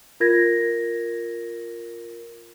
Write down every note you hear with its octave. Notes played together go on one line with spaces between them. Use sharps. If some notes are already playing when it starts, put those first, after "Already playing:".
F4 A#4 G#6 A#6